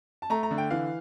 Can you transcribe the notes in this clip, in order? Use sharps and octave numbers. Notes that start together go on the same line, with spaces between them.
A5
A3 A#5
A#5
D3
G5
E3 F5